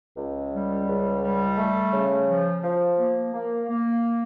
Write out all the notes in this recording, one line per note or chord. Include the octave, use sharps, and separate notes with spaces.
C#2
G3
C#2
G3
A3
C#3
F3
F3
A#3
A#3
A#3